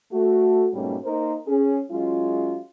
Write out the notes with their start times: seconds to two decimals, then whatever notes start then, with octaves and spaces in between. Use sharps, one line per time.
0.12 A3 F#4
0.73 G#2 B2 G3 A3 A#3 C#4
1.04 A#3 D#4 A#4 C5
1.47 C#4 G#4
1.90 F#3 G#3 C#4 F4